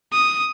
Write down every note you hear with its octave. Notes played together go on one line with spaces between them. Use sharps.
D#6